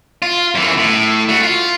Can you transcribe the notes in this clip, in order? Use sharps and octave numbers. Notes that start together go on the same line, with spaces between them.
F4
F#2 E3
A2
A3 F#4
F4